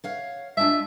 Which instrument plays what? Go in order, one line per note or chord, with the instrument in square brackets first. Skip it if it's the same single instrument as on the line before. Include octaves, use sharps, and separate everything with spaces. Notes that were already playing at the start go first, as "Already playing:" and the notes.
[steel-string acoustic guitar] C#5 F5 F#5
[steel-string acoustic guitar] G#3 D4 F4 [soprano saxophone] E5